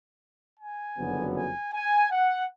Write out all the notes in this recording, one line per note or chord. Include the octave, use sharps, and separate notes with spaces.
G#5
F#1 F2 D3 F#3 B3
G#5
G#5
F#5